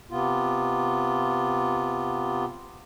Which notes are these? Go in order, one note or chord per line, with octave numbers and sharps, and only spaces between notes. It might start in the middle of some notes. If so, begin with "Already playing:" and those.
C3 B3 F4